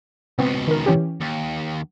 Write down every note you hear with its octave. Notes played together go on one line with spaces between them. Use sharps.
C#2 B2 B3 C4
D#3 A#4
E3 C#4 G4
D#2